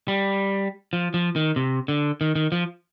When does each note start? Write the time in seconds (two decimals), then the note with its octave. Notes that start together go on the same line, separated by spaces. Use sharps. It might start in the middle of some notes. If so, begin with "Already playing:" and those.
0.08 G3
0.93 F3
1.14 F3
1.36 D#3
1.56 C3
1.88 D3
2.21 D#3
2.35 D#3
2.52 F3